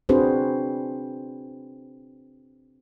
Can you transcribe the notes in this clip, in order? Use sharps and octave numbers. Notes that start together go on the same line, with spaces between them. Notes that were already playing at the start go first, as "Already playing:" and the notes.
C4 D4 F#4 G#4 B4 C5